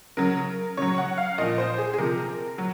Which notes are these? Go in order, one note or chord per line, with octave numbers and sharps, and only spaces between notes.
C#3 F#3 A#4
C#3 F#3 C#5
F#5
F5
A#2 F3 D#5
C5
G#4
G#4
C3 F3 A#4
F#3